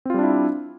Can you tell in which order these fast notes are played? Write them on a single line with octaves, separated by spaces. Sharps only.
C4 F4 G3 D4 E4